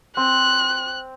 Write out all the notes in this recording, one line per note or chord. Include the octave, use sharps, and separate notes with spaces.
C4 F#6